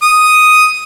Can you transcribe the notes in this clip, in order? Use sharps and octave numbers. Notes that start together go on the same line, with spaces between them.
D#6